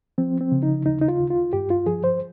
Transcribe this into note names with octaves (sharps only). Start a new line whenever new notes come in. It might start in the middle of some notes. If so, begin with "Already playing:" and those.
F3 C4
C4
C#3
D#4
D#2 D#4
D#4
F4
D#2
F4
G2 G4
F4
F3 G#4
C5